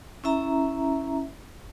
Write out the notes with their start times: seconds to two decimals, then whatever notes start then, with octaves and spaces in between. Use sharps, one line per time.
0.24 C#4 E4 E5 A#5